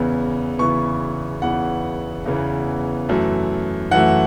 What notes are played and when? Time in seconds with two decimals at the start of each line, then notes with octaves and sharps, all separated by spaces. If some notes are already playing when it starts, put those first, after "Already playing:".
Already playing: E2 C#3 E3 B3
0.59 E2 C#3 E3 B3 C#6
1.42 E2 C#3 E3 B3 F#5
2.26 E2 C#3 E3 B3
3.09 F#2 E3 A3
3.91 F#2 E3 A3 F#5